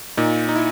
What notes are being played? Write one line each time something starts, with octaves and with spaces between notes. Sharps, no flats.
A#2 D#4
D#4
E4